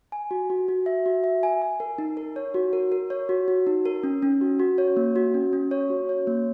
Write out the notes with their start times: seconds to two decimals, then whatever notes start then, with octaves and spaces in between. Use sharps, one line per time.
0.12 G#5
0.31 F#4
0.50 F#4
0.68 F#4
0.86 E5
1.06 F#4
1.24 E5
1.43 G#5
1.62 G#5
1.80 A#4
1.98 D#4
2.17 A#4
2.36 C#5
2.54 F#4
2.73 A#4
2.92 A#4
3.10 C#5
3.29 F#4
3.48 F#4
3.67 D#4
3.86 A#4
4.03 C#4
4.22 C#4
4.41 F#4
4.59 F#4
4.78 C#5
4.97 A#3
5.16 F#4
5.34 C#4
5.53 C#4
5.71 C#5
5.90 F#4
6.09 C#5
6.27 A#3